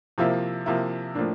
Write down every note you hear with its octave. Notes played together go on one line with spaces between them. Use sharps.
C3 F3 A#3 E4
C3 F3 A#3 E4
A2 F3 A#3 D4